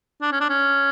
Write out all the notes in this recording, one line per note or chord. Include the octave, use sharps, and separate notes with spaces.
D4
C#4
D4
C#4